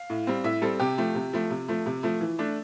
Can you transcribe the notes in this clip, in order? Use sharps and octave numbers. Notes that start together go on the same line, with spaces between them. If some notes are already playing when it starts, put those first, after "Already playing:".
Already playing: F5
A2
G3 C4
A2 E5
G3 C4 A4
C3 G4
F3 A3
C3
F3 A3
C3
F3 A3
C3
F3 A3
E3
A3 D4